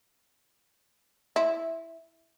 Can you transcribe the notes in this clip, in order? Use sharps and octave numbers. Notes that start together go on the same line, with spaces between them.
E4